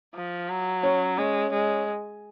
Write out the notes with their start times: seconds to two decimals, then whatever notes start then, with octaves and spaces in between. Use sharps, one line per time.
0.15 F3
0.49 F#3
0.83 C#4 C#5
1.18 G#3 C#4 C#5
1.52 G#3